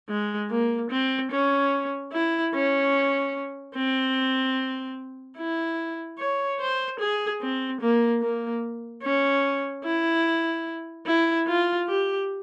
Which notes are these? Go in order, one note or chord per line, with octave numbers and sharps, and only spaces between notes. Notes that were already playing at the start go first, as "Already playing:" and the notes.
G#3
A#3
C4
C#4
E4
C#4
C4
E4
C#5
C5
G#4
C4
A#3
A#3
C#4
E4
E4
F4
G4